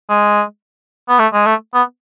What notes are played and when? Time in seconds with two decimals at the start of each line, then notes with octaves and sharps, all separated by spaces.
0.09 G#3
1.09 B3
1.19 A3
1.34 G#3
1.46 A3
1.74 B3